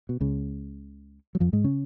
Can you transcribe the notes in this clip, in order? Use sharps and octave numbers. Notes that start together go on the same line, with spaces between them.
B2
C#2 C#3
F#3
F2 F3
G#2 G#3
C#3 C#4